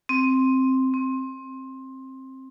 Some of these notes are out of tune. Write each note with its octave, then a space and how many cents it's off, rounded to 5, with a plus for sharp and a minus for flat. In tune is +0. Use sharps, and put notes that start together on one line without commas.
C4 +5
C4 +15